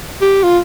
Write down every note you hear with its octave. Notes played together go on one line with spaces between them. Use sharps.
G4
F4